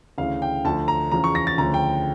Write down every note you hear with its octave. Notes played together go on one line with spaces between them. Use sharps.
D2 C#3 E3 F5
G5
D2 D3 F3 A5
A#5
E2 C#3 F3 A#5
C#6
A#6
A6
D2 C#3 F3 A#5
G5